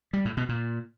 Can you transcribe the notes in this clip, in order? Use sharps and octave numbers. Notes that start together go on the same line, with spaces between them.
G3
A2
B2
A#2